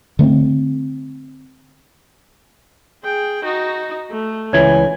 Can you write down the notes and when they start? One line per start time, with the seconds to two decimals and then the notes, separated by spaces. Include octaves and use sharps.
0.19 D3 A3 B3 C4
3.04 G#4 G5
3.44 D#4 F#4
4.11 A3
4.53 C#2 E3 C#5 G#5 G#6